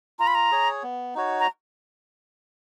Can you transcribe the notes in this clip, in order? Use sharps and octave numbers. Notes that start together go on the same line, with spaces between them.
F4 A#5
B5
A#5
G#4 C#5
B3
D#4 F#4 C#5
A#5